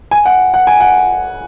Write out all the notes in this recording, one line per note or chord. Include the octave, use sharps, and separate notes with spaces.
G#5
F#5
F#5
G#5
F#5